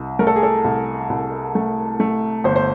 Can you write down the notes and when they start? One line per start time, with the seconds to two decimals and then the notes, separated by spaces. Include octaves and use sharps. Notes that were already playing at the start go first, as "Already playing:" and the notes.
Already playing: C2
0.19 A3 A#4
0.27 A4
0.36 G#4
0.43 A4
0.64 C2
1.10 C2
1.55 A3
2.00 A3
2.44 G1 C5
2.56 C5